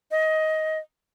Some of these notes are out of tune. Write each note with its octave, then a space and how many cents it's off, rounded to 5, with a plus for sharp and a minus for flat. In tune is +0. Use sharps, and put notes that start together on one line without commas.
D#5 +15